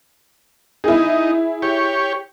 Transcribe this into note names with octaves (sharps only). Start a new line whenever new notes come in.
D#4 E4 G#4
G4 C#5